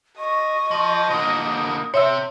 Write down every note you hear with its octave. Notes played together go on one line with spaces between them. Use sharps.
D#5 C#6
F3
D3 A#3 D#6
C3 C#5 E5 E6